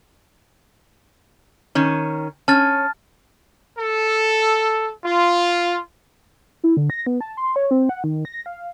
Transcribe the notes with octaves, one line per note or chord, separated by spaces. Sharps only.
D#3 C#4
C#4 A5 F6 A6
A4
F4
E4
D3
A#6
B3
A5
C6
C#5
C4
F#5
D#3
A#6
F5